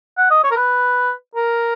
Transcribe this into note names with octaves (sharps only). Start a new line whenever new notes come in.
F#5
D#5
C#5
A#4
B4
A#4